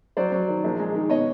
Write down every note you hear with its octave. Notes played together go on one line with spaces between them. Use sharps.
F#3 C5 D5
F#3
D#3
A#1
G#3
D#3
B2 C#5 D#5